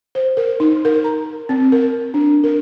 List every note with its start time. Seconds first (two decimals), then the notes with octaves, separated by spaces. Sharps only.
0.15 C5
0.37 A#4
0.60 D#4
0.85 A#4
1.04 A#5
1.49 C4
1.72 A#4
2.14 D4
2.44 A#4